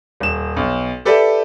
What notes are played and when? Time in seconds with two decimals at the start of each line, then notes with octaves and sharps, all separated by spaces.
0.20 D#1 E7
0.56 B1
1.05 G4 A4 B4 D5 E5